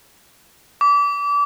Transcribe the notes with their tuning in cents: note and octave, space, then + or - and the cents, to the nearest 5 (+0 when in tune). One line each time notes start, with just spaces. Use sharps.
D6 -30